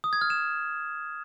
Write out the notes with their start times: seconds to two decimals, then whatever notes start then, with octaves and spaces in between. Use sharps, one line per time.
0.04 D#6
0.13 G#6
0.21 F6
0.30 E7